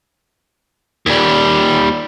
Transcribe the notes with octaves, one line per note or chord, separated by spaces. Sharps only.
D#2 G3